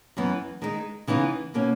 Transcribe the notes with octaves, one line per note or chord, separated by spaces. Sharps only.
F#2 E3 B3
D#3 G#3 D#4
C#3 E3 B3 D#4
B2 A#3 C#4